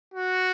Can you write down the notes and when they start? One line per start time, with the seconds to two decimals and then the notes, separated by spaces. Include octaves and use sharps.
0.14 F#4